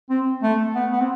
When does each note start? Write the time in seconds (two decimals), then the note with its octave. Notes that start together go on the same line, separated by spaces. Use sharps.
0.10 C4
0.43 A3
0.75 B3
0.92 B3
1.01 C4